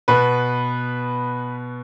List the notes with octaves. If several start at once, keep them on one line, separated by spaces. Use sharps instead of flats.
B2 B3 B4